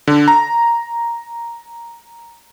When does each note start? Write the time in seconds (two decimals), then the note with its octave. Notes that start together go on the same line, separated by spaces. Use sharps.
0.07 D3
0.28 A#5